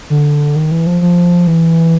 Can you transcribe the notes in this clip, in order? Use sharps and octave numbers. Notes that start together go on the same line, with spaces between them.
D3
D#3
E3
F3
F3
E3